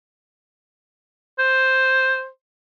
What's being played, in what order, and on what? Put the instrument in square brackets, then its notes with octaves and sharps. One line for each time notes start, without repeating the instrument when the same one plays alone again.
[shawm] C5